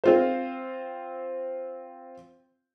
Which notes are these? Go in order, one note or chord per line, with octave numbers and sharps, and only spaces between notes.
C4 F4 C5